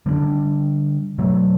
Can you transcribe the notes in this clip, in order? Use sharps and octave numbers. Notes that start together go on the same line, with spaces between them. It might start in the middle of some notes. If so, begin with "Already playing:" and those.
D3 G3 B3 D4
B2 F#3 A3